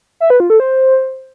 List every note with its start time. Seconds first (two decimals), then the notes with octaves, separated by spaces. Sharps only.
0.20 E5
0.30 B4
0.40 F4
0.50 A4
0.60 C5